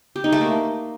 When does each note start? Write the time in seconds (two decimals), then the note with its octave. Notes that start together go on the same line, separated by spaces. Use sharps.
0.16 G4
0.24 D#4
0.32 A3
0.41 A#3